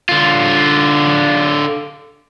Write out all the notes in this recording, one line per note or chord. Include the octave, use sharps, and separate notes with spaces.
D3 F4